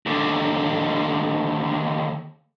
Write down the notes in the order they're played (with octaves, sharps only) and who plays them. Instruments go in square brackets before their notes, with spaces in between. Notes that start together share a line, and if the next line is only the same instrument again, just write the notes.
[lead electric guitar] D#2 D3